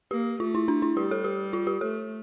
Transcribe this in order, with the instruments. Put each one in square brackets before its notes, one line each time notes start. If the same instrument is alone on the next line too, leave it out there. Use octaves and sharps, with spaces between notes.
[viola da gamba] A#3 [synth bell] G4
[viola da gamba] A3 [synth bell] F4
[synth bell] E4
D4
E4
[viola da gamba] G3 [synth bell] G4
[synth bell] A4
G4
F4
G4
[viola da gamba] A3 [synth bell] A4